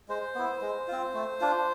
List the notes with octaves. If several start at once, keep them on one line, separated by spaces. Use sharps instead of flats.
G#3 C5
B3 E4
G#3
C4 F4
A3
D4 F4